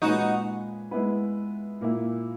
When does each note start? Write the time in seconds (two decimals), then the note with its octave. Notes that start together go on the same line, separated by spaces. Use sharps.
0.02 A#2 G#3 C#4 D#4 F#4 G#4 B4
0.91 G#3 B3 E4 B4
1.81 A#2 A#3 E4